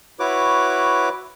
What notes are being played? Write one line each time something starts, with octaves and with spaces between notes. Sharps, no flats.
E4 F#4 B4 C#5 D6